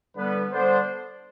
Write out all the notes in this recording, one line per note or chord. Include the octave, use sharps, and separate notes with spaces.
D3 G3 B3 D4 B4
D3 G3 B3 D4 C5